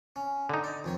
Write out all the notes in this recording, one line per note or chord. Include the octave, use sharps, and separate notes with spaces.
C#4
D3 D#4
D5
F2 D#3 C#5